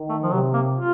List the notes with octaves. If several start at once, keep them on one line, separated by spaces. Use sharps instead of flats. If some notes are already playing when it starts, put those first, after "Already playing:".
Already playing: D#3
A3
F3
C3 F#3
A#3
F4